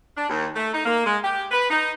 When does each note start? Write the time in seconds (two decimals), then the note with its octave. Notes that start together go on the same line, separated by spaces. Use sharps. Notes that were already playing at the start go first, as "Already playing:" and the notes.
0.17 D4
0.29 D#2
0.55 A3
0.73 D#4
0.85 A#3
1.05 G#3
1.23 G4
1.51 B4
1.70 D#4